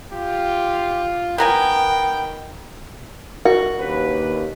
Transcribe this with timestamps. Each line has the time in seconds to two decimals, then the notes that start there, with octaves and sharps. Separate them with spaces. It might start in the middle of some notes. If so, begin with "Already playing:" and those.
0.12 F4 G4
1.38 D#3 B3 A#4 G5 G#5
3.45 F#4 A#4
3.79 D#2 C#4 D4 B4